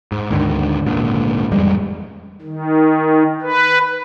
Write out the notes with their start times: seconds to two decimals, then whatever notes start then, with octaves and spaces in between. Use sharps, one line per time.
0.12 G#2
0.30 D2 G#2 D3 D#3
0.86 G#1 C#2 A#2 D3
1.51 A1 F2 G3 G#3
2.42 D#3
3.42 B4